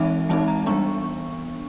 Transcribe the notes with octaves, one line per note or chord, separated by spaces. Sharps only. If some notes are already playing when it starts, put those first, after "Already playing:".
Already playing: E3 G#3 C4 D#4 E5
E3 G#3 C4 D#4 A5
A#5
E3 G3 B3 D4 C#6